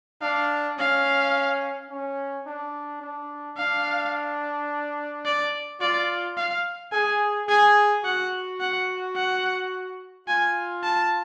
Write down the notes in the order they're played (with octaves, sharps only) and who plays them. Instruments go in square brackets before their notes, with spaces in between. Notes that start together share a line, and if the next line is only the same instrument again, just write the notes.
[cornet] D4 [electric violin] F5
[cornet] C#4 [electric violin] F5
[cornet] C#4
D4
D4
[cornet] D4 [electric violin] F5
[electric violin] D5
[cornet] F4 [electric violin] D5
[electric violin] F5
[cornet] G#4 [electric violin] G#5
[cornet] G#4 [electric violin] G#5
[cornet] F#4 [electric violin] F#5
[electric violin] F#5
F#5
[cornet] F4 [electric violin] G#5
[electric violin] A5